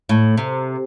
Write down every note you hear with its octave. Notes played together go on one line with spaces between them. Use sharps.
A2
C3